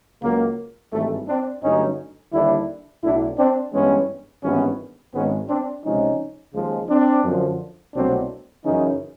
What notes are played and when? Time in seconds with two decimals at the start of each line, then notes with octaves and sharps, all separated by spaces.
0.23 C#2 C#3 F#3 A#3
0.93 G#1 G2 E3 A3
1.28 C4 D4
1.63 G2 D3 F#3 A3 C#4 D#4
2.33 D#2 D3 G3 D4 E4
3.04 B1 A2 F#3 D4 E4
3.38 C4 D4
3.73 G2 E3 G#3 B3 C#4
4.44 G#1 G2 E3 B3 C#4
5.14 G#1 G#2 D#3 G#3 B3 C#4
5.49 C4 D4
5.84 C#2 C3 F3 G#3 C#4 D#4
6.54 D#2 C#3 F3 G#3
6.90 C4 D4
7.24 F#2 D3 F3
7.94 C2 B2 F#3 A3 C4 D4
8.64 F#2 C#3 E3 C#4 D#4